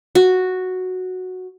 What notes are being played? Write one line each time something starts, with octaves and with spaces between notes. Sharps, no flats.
F#4